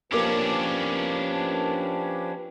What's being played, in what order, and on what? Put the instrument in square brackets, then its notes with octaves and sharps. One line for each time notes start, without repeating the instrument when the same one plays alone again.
[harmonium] F3 G4 B4 [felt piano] A#3 D6 [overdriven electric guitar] C#4 D4